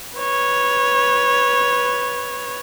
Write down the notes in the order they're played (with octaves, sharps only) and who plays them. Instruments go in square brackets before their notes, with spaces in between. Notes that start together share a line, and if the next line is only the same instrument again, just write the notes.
[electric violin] B4 C#5